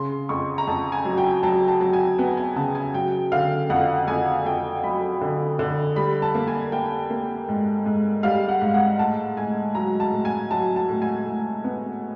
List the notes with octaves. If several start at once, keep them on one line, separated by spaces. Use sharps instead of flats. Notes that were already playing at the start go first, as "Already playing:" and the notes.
Already playing: C#3 C6
F2 C#6
A#5
F2 A5
G#5
F#3
G5
F#3 A5
A5
F#3
G#5
B3 G5
G#5
C#3 A5
G#5
F#3 G5
D3 F5
F2 F#5
F2 G#5
F2 G5
F#3 B5
D3
D3
G3 B5
A5
A#3
G#5
A#3 G5
A#3
G#2
G#2
G3 F5
F#5
G#2
F#5
A2 A5
A2 G#5
F#3 A#5
A5
A2
G#5
F#3 A5
A5
A2
G#5
A2
B3